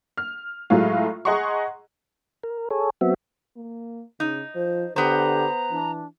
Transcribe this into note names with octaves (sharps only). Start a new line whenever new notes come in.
F6
A2 F#3 G#3 A3 F4
G#4 D#5 F#5 A#5 C6 C#6
A#4
G#4 A4 C#5
F#3 B3 C4 F#4 E5
A#3
C#3 D#4
F3 C5
D3 B3 G4 C5 A#5
E3 D4